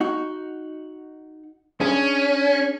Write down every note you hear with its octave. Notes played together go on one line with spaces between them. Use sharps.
D#4 F#4
C#4 D4 G#4